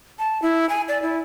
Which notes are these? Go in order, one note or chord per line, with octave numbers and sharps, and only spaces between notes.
A5
E4
G#5
D5
E4